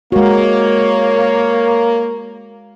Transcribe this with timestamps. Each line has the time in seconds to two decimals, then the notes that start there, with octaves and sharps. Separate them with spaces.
0.12 G#3 A#3 F#4 C#5